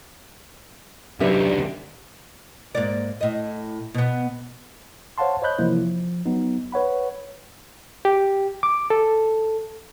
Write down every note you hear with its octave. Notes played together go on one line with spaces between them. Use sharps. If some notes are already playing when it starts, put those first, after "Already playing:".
C2 D3 F#3 D#4 G4 B4 D5 E5
G#2 A#3 D5
A2 D#5
B2 B3
C5 C#5 F5 F#5 A5 C6
C5 C#5 D#5 B5 F#6 G6
C3 E3 F3 A#3 E4
F3
F#3 B3 D#4
B4 C#5 F#5 B5
G4
D6
A4